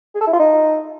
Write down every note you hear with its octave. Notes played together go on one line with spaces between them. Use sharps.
G#4
A4
E4
F4
D#4